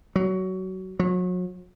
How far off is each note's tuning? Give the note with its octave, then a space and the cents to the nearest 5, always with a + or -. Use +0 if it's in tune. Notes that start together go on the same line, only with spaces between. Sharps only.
F#3 +20
F#3 -35